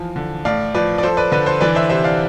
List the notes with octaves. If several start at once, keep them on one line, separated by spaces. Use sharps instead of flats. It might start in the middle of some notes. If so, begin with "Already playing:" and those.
Already playing: E3 F3 F5
D3
A2 D5 F5
F3 B4 D5
D5
F3 A4 C5
B4 D5
D3 B4 D5
A4 C5
E3 B4 D5
C5 E5
C3 C5 E5
D5 F5